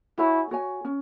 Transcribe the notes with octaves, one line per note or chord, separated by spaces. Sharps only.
E4 F#4 C#5 G#5
F#4 C#5 G#5
C#4